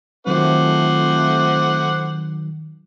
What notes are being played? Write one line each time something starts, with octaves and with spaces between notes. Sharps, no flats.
D#3 F#3 A3 C4 F4 C5 F#5 D6